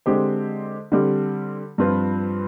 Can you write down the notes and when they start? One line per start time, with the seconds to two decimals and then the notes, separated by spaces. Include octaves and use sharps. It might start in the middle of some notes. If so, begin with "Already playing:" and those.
0.06 D3 G#3 C4 G4 C5
0.92 D3 G3 C4 G4
1.78 G2 F3 C4 F4 B4